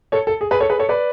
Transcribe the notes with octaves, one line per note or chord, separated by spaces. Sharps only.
A4 C#5
A4
G#4
G#4 B4
A4 C#5
G#4 B4
A4 C#5
B4 D5